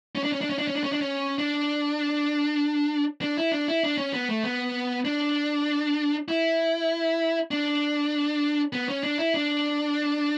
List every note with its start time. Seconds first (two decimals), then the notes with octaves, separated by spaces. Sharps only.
0.15 C#4
0.23 D4
0.32 C#4
0.41 D4
0.50 C#4
0.58 D4
0.68 C#4
0.76 D4
0.84 C#4
0.92 D4
1.01 C#4
1.38 D4
3.22 D4
3.37 E4
3.52 D4
3.68 E4
3.83 D4
3.98 C#4
4.13 B3
4.29 A3
4.44 B3
5.05 D4
6.28 E4
7.51 D4
8.73 B3
8.89 C#4
9.03 D4
9.18 E4
9.34 D4